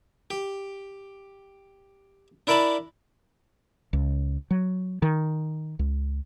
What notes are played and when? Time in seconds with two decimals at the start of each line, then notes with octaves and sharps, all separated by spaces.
0.30 G4
2.47 D4 E4 A#4 D5 A5 B5
3.93 C#2
4.51 F#3
5.02 D#3
5.79 C#2